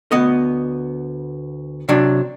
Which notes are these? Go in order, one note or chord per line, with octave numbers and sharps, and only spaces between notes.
D2 B3 D#5
C3 F#3 D4